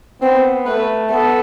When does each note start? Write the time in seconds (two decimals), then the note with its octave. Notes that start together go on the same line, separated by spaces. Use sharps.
0.22 B3 C4
0.67 A3 B4
1.11 B3 A4